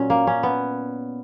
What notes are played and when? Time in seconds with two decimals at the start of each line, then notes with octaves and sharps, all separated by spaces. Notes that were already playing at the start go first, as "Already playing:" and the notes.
Already playing: A#2 F#3 C#4
0.10 A#3
0.27 C#4
0.43 B3